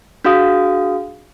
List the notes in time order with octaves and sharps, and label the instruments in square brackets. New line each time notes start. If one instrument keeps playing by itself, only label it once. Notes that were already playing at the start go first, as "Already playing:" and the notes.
[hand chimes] D4 F#4 G#4 F5 D#6